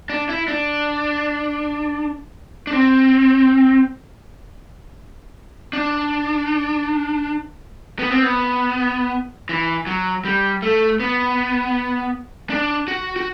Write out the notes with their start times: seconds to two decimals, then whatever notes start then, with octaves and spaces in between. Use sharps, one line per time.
0.10 D4
0.29 E4
0.48 D4
2.67 D4
2.73 C4
5.73 D4
7.99 B3
8.11 C4
8.23 B3
9.49 E3
9.87 F#3
10.25 G3
10.62 A3
11.00 B3
12.50 D4
12.88 F#4
13.16 F#4